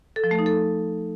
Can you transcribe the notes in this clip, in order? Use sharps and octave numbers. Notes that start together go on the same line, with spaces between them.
A4
F3
A3
D#4
A4